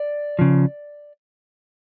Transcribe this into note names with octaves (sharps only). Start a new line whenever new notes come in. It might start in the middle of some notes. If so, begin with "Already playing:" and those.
Already playing: D5
C#3 F3